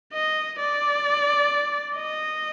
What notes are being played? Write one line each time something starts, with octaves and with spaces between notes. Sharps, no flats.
D#5
D5
D#5